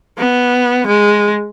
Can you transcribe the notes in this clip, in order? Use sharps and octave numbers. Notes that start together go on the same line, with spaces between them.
B3
G#3